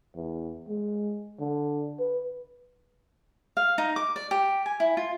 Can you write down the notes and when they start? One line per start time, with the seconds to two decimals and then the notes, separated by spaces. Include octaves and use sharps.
0.16 E2
0.68 G#3
1.40 D3
2.00 B4
3.57 F5
3.78 D#4
3.96 D6
4.16 D5
4.31 G4
4.66 G#5
4.80 E4
4.97 F4